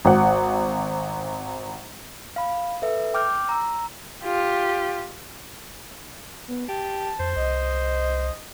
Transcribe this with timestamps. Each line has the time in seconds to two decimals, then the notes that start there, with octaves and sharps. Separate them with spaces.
0.05 G#1 F#5
2.36 F5 B5
2.82 A4 B4 E5
3.14 G5 D6 F6 G6
3.49 A#5 E6
4.23 F4 G4
6.48 B3
6.68 G4 A5
7.20 F2 C5
7.36 C2 D#5